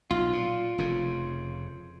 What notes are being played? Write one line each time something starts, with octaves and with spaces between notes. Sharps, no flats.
B1 F4
A#2
F1 F2 C#3